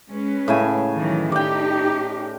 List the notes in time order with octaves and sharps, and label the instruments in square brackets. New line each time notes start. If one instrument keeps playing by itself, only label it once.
[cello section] G#3 C#4 B4
[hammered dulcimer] A2 C#3 G#5
[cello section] D#3 E3 F#3
[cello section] D#4 G4 [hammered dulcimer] D5 G5